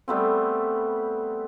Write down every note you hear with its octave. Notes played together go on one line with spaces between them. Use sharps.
G3 A3 B3 C4